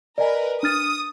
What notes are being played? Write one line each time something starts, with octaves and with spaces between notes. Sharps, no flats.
A#4 B4 D5 D#5 G#5
D4 D#6 F6 A6